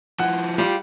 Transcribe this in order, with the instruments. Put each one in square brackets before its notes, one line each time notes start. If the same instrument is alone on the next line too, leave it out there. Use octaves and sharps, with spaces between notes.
[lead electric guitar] F3 E4 [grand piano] F#5
[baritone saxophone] G3 [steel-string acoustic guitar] F4 G4